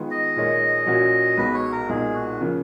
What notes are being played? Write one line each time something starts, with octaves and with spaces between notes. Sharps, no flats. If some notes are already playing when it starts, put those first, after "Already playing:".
Already playing: D#3 G#3 B3 F4
D#5
A#2 G#3 D#4 A#4 C#5
A#2 F#3 C#4 F#4 C#5
B1 B2 G#3 B4
C#5
A#4
B1 A#2 G#3 D#4 G#4
F#4
C#3 F3 A#3